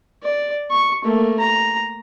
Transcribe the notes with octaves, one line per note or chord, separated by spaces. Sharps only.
D5
C#6
A3 A#3
A#5